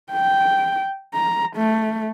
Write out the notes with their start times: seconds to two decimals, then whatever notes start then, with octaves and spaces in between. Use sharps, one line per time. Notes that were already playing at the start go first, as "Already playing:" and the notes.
0.12 G5
1.14 A#5
1.57 A3